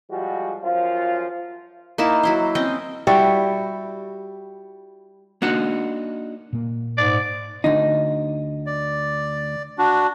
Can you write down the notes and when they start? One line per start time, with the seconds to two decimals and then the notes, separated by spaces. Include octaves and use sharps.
0.10 F3 G3 G#3 F#4
0.63 F#2 F3 F4
1.98 A#3 D#4 E4 A5
2.23 F#3 E4 C5
2.55 C4 C#4 D#5 G5
3.07 G3 E4 F#4 G4
5.42 A#3 D4 D#4 F#4 F#5
6.53 A#2 A#3
6.98 G#2 D5
7.64 D2 D3 D#4
8.67 D5
9.78 D4 F#4